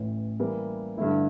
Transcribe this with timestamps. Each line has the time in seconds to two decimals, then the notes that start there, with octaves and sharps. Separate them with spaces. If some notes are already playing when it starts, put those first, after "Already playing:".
Already playing: A1 A2 E3
0.39 E3 G3 A#3
0.97 G2 D3 A3 E4